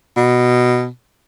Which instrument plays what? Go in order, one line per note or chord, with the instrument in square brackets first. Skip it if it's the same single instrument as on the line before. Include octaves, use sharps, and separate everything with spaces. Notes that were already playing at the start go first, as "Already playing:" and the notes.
[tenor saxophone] B2